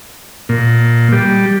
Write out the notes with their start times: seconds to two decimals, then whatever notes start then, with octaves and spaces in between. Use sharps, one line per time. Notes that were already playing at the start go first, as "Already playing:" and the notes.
0.49 A#2
1.12 G3